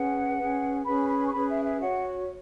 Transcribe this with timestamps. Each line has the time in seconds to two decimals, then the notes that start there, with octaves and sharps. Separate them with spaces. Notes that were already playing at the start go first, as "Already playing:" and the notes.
Already playing: C#4 G#4 B4 F#5
0.38 C#4 G#4 B4
0.85 C#4 G#4 B4 B5
1.09 B5
1.27 C#6
1.33 C#4 G#4 B4 B5
1.49 E5
1.65 E5
1.81 F#4 C#5 F#5